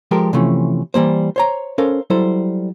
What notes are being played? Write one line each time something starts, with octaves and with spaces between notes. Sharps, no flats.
F3 G#3 G4 A4 A#4
C3 E3 F3 A3 C#4
E3 G3 A#3 C5
C5 C#5 A#5
C#4 A4 A#4 C5 F5
F#3 G3 E4 A4 C5